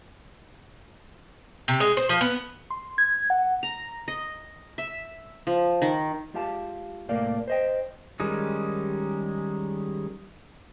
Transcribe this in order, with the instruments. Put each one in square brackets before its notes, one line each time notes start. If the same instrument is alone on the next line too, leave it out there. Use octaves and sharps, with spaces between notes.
[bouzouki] C3
G#3
C5
F3
B3
[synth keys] C6
G#6
F#5
[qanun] A#5
D#5
E5
F3
D#3
[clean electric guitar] G#3 F4 G4 F5 A5
C2 A2 A3 A#3 D5 F5
C5 D#5 G5
[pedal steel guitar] D#3 G3 G#3 C#4 D#4